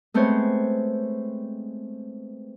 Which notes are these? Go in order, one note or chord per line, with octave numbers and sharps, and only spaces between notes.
G#3 A3 B3 C4 C5 C#5